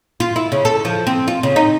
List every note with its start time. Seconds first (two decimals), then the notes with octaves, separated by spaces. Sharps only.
0.20 F4
0.36 E4
0.52 C#3
0.65 A4
0.85 F3
1.07 C4
1.28 F4
1.43 C#3
1.56 D#4